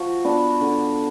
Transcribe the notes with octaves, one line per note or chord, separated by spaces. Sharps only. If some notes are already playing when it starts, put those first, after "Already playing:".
Already playing: F3 F#4
B3 D4
D3